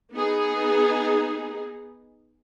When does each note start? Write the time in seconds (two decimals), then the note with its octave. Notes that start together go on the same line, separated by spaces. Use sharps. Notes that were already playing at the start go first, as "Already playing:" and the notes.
0.14 B3 D#4 G#4